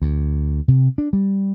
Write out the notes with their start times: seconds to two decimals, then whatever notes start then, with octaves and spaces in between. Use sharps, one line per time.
0.02 D2
0.68 C3
0.98 D4
1.13 G3